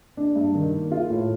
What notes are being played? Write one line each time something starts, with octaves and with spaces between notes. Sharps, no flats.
D4
G2
D#3
A#3
F4
A2